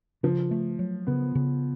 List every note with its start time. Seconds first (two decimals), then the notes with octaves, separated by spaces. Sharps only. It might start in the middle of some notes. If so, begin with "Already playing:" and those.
0.23 C#3 F3
0.51 A3
0.79 F#3
1.07 C#3 B3
1.35 C#3